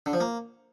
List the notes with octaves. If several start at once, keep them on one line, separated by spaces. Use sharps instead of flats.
D3
F3
A#3